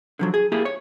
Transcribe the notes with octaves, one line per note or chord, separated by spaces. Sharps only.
D3 F3 F#3
G#4
A#3 E4 G4 G#4
C#5